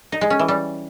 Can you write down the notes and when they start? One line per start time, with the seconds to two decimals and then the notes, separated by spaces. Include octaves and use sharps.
0.12 D#4
0.21 G#3
0.30 C#4
0.39 E3
0.48 G3